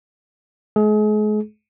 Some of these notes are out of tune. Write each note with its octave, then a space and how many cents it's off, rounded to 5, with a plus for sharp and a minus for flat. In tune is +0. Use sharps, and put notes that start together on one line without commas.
G#3 +40 G#4 +35